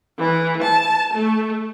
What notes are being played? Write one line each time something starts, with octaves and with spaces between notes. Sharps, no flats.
E3
A5
A3